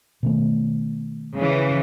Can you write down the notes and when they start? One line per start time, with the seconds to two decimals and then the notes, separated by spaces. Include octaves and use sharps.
0.23 B2 D#3 A3
1.35 C#3 E3